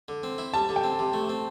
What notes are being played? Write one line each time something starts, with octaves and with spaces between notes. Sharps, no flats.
D3
C4
E4
G3 A5
D3
G5
C4
C3
A3
C4